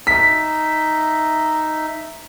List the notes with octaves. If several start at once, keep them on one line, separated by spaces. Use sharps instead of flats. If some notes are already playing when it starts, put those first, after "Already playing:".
D#4 E5 B6